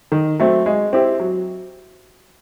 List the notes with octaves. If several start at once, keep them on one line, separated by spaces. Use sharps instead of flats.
D#3
F#3 A3 C4
G#3
C4 E4 G4
F#3